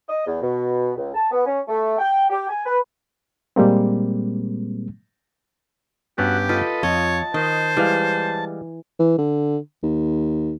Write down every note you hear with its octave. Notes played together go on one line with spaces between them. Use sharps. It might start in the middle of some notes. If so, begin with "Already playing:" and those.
D#5
E2
B2
C#2
A5
B3
C#4
A3
G5
G4
G#5
B4
A#2 G3 G#3 A#3 C4
G2 B3 C#4 F#4 G4
F4 A4 B4 D#5
F2 C#5 D#5 A5
D#3 C5 D#5
E3 G3 G#3 F5
E3
D3
D#2